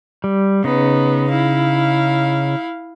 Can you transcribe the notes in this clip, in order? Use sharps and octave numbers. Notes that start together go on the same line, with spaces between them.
G3
C#3 B3 D#4
E4 F5